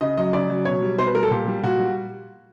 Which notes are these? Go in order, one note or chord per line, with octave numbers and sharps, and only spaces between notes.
C#3 D#5
F#3 D#5
C#3 D5
F#3
B2 C#5
G3
B2 C5
B4
G3 A#4
A4
A#2 G4
G3
A#2 F#4
G3